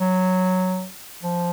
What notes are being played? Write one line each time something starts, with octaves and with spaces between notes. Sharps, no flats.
F#3
F3